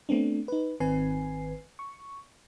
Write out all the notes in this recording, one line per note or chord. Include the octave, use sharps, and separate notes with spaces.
A3 B3 C4 D4
D#4 B4
G#1 D#3 C4 B4 G#5 C7
C#6